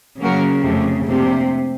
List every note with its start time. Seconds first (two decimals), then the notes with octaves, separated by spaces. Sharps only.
0.20 C#3 F#3 A#3 C#4 F#4 A#4
0.62 F2 C3 F3 A3
1.05 A2 C3 F3 A#3 D4 G4